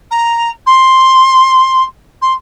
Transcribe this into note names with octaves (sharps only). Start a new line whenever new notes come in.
A#5
C6
C6